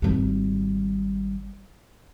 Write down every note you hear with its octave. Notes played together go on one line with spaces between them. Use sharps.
G#1 G3